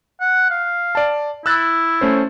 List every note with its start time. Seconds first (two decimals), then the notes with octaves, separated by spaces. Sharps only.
0.21 F#5
0.50 F5
0.95 D5 A5
1.46 E4 E6 F#6 A6
2.01 A3 C#4 C5